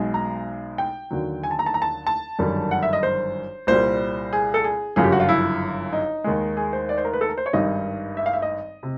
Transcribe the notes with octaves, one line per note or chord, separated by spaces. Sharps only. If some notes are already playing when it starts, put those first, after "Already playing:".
Already playing: B1 B2 G#3
A#5
G5
D#2 D3 F#3
G#5
A5
A#5
A5
A#5
A5
A5
G1 F#2 D#3 G3
F#5
E5
D#5
C5
C2 A#2 G3 C5
G#4
A4
G#4
G1 F#2 C#3 F3 G#4
G4
F#4
F4
E4
D#4
D#2 D#3 G#3
G#4
C5
D5
C5
A#4
B4
A4
A#4
C5
C#5
G#1 G2 D#3 G3 D#5
E5
F5
E5
D#5
C3